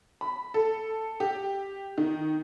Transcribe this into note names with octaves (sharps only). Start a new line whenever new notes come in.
B5
A4
G4
D#3